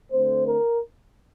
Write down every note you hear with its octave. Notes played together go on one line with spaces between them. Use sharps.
D3 A3 C4 C5
A#4